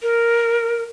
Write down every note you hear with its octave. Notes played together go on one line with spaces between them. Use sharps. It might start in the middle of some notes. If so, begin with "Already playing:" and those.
A#4